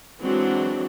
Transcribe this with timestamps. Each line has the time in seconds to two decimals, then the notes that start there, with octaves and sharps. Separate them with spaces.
0.21 E3 F#3 G#3 C4 D4 F#4